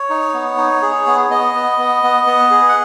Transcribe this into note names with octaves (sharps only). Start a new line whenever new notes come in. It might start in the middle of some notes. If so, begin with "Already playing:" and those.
Already playing: C#5
D#4
B3
D#4
G#4
B3
B3 D#5
B3
B3
B3
B3
G#4
F#5